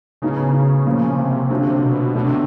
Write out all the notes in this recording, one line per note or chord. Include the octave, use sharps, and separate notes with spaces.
A2 C#3 F#3 B3 D#4 G#4
A#2 F3 A#3 C#4
C3
D3 F#3 A3 D4 F4
B2
B2 D3 F#3 A3 D4
C3